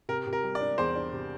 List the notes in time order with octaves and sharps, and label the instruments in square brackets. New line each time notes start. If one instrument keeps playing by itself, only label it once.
[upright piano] C3 [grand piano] A#4
[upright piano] C3
[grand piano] A#4
[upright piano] G3
[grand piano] D5
[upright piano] D4
[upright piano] E2 [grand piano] C5
[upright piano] D4
C3